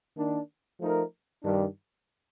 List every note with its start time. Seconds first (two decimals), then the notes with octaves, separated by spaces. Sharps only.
0.16 D#3 A#3 D4
0.79 F3 A3 D#4 A#4
1.42 G2 D#3 G3 D4